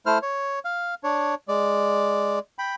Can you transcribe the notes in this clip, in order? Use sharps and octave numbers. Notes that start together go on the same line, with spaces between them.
A3 E4 C5 F6
C#5
F5
D4 C#5
G#3 D5
G5 B5